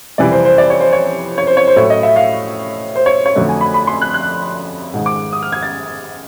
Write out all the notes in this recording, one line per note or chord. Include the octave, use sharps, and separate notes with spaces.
F2 C3 E3 G3 D5
C5
C5
D5
C#5
C5
C#5
C#5
C5
C#5
C5
A2 F#3 A3 C#5
D#5
E5
F5
C5
C#5
C#5
F2 D3 F#3 A3 D4
G#5
B5
B5
C6
F#6
F#6
G#2 D#3 G#3
D6
D#6
F6
G#6
A6